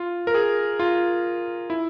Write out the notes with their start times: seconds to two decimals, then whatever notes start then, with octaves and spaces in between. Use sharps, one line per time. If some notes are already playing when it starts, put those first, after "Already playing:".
Already playing: F4
0.27 A#4
0.34 G#4
0.80 F4
1.70 E4